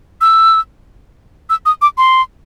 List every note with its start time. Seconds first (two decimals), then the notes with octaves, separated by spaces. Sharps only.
0.21 E6
1.50 E6
1.66 D#6
1.82 D6
1.98 C6